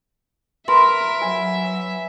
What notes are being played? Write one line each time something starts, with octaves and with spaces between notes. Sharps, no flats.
A#4 B4 E5 C6
F#3 G#5